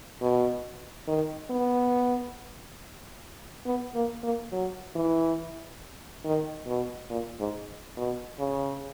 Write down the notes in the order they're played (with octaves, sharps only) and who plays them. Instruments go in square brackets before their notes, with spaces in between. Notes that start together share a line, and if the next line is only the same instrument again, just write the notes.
[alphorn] B2
D#3
B3
B3
A#3
A#3
F#3
E3
D#3
B2
A#2
G#2
B2
C#3